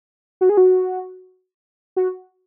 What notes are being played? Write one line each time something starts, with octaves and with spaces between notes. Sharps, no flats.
F#4
G#4
F#4
F#4